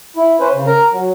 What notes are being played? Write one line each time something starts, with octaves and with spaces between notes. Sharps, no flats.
E4
C#4 B4 C5
C#3
A#4 A#5
F#3